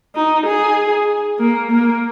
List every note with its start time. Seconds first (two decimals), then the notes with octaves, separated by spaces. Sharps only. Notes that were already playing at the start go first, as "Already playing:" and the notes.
0.15 D#4
0.46 G#4
1.39 A#3
1.71 A#3